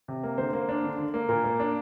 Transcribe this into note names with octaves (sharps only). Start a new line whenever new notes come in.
C3
A#3
D3 C5
A#3
D4
D3
D3
A#3
A#2 A#4
A#3
D4